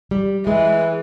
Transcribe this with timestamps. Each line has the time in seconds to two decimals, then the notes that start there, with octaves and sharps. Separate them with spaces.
0.11 G3
0.47 E3 G#3